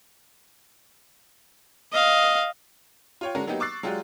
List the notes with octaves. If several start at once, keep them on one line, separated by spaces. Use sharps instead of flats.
D#5 F5
F4 C#5 G5
D3 G#3 C#4 D4 F#4 A#4
F#3 A#3 B3 D#4 G4
C#6 D6 E6 F#6 A6 C7
F#3 G#3 F4 G4 D5